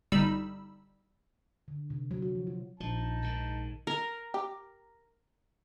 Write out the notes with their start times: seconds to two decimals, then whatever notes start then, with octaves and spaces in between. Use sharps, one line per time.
0.12 G1 G3 D#4 B5 E6
1.68 D3
1.90 C3
2.11 F#3
2.22 F#4
2.35 F3
2.47 F4
2.80 A#1 F3 D#4 A5
3.22 G#2 D#3
3.87 A#4
4.34 G4